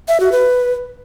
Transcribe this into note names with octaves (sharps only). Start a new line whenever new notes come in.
E5
F#4
B4